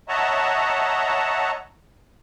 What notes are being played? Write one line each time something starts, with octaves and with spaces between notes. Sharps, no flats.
C#5 D#5 E5 F#5 A5 A#5